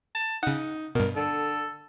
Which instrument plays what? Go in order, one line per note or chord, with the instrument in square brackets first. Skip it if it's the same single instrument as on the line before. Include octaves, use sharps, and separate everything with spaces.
[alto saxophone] A5
[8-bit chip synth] C#3 F#5 [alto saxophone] D#4
[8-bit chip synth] G2 B2 [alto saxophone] A#4
[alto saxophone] D3 [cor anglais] A4